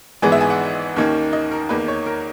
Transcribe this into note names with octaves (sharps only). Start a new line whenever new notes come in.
G#1 G#2 E3 G#3 B3 G#5
E5
G#5
F#5
D#2 D#3 A#3 C#4
D#5
A#4
E2 D#3 A#3 B4
C#5
A#4